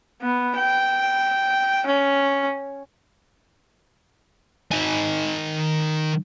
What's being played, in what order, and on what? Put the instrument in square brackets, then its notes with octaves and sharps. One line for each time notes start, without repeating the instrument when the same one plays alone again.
[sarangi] B3
G5
C#4
[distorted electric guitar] D#3 G#5